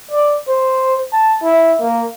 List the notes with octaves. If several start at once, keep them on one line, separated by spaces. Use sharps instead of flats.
D5
C5
A5
E4
A#3